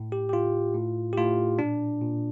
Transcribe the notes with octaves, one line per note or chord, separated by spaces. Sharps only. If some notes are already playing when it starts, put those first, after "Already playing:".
Already playing: A2
G4
G4
A2 F4
A2
G4
A2 F4
A#2 D4
A#2